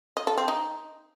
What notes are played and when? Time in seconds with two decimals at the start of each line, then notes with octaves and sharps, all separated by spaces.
0.17 D#5
0.27 A4
0.38 C4
0.48 D#4